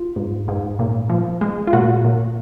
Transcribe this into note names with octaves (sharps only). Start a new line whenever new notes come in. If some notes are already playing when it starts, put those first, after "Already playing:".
Already playing: F4
G#2
G#2
A#2
F3
G#3
F4
A#2 F#4
A#2